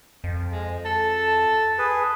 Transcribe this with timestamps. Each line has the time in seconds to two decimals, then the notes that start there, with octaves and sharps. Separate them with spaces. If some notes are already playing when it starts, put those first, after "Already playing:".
0.24 F2
0.52 G#3
0.85 A4 A5
1.79 G#4 B4